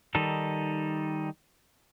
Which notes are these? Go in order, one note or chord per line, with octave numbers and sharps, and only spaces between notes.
D#3 G3 D#4 A4